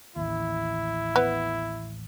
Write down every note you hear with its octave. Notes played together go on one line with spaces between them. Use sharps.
A1 D#2 E4
B3